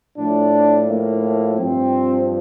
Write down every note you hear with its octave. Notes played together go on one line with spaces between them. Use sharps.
A2 F3 D4
A#3
G2 F3 C4